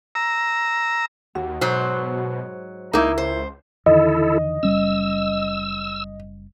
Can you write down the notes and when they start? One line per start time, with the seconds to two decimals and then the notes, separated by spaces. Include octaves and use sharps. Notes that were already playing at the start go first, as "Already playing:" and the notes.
0.15 A#5 E6
1.35 D#2 F#4
1.61 G#2 B2 F#3 C5
2.93 C#2 A#3 D#4 E4 A#4
3.18 C5
3.86 E2 D3 D#3 E4 A4 D#5
4.63 F#1 G3 C#4 E6